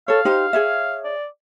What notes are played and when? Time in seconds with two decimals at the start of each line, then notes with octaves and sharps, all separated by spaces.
0.08 A4 C#5 F5
0.25 D#4 G4 C5
0.53 G#4 C#5 E5
1.04 D5